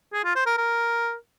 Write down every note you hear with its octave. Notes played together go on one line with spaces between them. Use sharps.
G#4
F4
C5
A#4
A#4